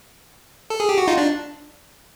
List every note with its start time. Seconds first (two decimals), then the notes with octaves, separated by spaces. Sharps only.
0.70 A4
0.80 G#4
0.89 G4
0.98 F#4
1.08 D#4 F4
1.17 D4